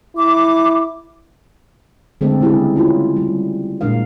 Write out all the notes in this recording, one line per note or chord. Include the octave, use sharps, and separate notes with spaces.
E4 D6
D3 G#3 A3 C4 A4
C#3 G3 G#3 E4 G4 G#4
C#4 E4 F4
G3
A#2 G#3 D4 A#4 F5